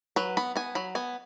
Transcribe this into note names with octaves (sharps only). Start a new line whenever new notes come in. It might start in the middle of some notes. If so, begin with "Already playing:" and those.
F#3 B4
B3 B5
B3 G#5
F#3 B5
B3 G#5